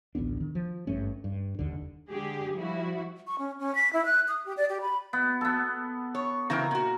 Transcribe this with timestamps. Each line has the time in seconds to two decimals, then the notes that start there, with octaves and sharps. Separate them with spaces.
0.15 A1 D2 B3 D4
0.40 D#3
0.55 F3
0.87 G#1 G2 A3 C#4
1.24 G2
1.59 F1 D#2 D3
2.09 D3 G#3 G4 G#4
2.55 F3 G3 E4 F#4
3.27 C#6
3.39 C#4
3.59 C#4
3.75 B6
3.93 E4
4.05 F#6
4.28 D#6
4.46 G4
4.57 D5
4.69 G4
4.81 B5
5.13 B3
5.41 B3 A4
6.15 C#5
6.50 C#3 E3 C4 A#4 A#5
6.71 A#2 F#4